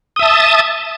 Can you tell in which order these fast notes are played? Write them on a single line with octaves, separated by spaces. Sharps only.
D#6 E5 A5